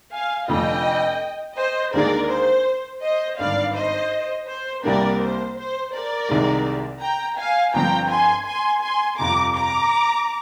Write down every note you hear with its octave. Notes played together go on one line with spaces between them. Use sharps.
F5 G#5
F1 F2 D3 F3 D#5 G5
C5 D#5
D#2 D3 G#3 D4 G#4 A#4 D5
C5
C5 D#5
G#1 G2 D3 D5 F5
C5 D#5
C5
C2 C3 G3 A#3 D4 A#4 D5
C5
C5
A#4 D5
C2 C3 D#3 G#3
G5 A#5
F5 G#5
G1 G2 D3 F3 C4 G5 A#5
G#5 C6
G#5 C6
G#5 C6
G1 F2 C3 A#5 D6
A#5 D6